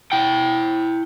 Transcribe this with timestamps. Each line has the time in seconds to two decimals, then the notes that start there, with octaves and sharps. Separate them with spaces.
0.12 E4 G5